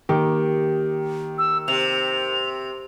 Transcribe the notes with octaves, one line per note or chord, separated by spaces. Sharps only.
D#3 A#3 G4
E6
C3 F7